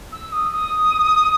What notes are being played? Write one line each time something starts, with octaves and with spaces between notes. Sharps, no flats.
E6
D#6
D#6